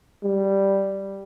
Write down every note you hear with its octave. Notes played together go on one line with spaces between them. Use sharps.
G3